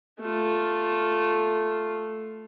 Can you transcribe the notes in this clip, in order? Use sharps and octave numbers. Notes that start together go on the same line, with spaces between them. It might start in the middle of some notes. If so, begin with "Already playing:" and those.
A3 F4